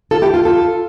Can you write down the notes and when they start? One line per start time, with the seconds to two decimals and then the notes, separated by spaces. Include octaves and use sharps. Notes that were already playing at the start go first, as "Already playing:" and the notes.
0.11 F4 A4
0.22 E4 G4
0.34 F4 A4
0.45 F4 A4